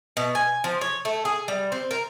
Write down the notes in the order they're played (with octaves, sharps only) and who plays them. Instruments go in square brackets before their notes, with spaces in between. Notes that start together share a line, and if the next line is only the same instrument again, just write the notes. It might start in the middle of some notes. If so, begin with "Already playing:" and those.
[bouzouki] B2
G#5
F3
C#5
A3
G#4
G3
C4
A#4